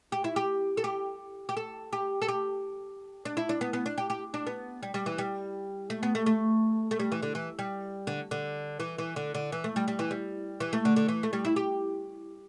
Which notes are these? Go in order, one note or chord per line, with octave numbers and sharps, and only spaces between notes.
G4
E4
G4
A4
G4
G4
A4
G4
A4
G4
D4
E4
D4
B3
B3
D4
G4
G4
D4
B3
G3
G3
E3
G3
A3
B3
A3
A3
A3
G3
E3
D3
E3
G3
D3
D3
E3
E3
D3
D3
E3
A3
G3
G3
E3
G3
E3
A3
D3
D3
E3
A3
G3
E4
G4